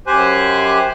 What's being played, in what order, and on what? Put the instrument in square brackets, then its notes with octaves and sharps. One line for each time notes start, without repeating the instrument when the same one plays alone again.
[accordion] F#2 G4 C5 G#5 F#6